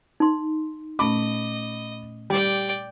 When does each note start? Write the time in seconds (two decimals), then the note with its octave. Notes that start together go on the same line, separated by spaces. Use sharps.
0.20 D#4 C6
0.99 A#2 A3 C#4 D#5 B5 D6
2.30 G3 D5 G5